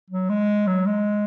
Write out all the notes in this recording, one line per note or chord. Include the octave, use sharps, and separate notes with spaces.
F#3
G#3
F#3
G#3